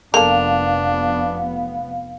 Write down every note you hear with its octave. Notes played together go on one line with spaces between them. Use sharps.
F1 A#3 B3 D4 A4 F5